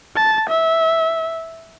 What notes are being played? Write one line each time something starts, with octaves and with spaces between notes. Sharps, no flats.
A5
E5